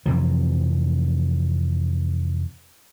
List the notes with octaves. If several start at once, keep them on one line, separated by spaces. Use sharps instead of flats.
F2 C3 E3 F3